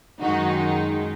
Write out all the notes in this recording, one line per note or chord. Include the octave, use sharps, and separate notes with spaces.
F#2 D#3 G#3 D#4 F#4